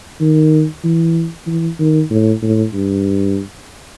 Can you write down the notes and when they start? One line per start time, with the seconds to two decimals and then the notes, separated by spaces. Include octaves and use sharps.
0.21 D#3
0.84 E3
1.47 E3
1.79 D#3
2.10 A2
2.42 A2
2.74 G2